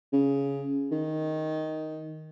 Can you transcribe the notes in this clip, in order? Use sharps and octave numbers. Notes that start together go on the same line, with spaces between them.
C#3
D#3